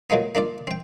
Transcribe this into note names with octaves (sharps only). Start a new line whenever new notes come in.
A#2 F#3 G#3 A#3 B3
A#3 D4 F4 D5
C4 G5